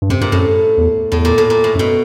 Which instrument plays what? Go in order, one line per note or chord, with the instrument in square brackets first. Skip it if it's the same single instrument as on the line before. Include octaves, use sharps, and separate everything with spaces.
[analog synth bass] G2
[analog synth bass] F#2 [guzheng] C3
[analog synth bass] G2 [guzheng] A#2
[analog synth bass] F#2 [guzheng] A2
[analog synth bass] E2
[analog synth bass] E2 [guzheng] A2
[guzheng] A#2
A2
A#2
A2
[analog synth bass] F#2
[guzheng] B2